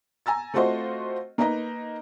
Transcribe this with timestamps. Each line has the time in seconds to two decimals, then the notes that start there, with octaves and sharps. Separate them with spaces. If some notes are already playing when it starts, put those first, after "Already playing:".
0.26 G#5 A#5 E6 A6
0.54 A3 C4 F4 F#4 C5 D#5
1.38 A#3 D#4 B4 D#5 A#5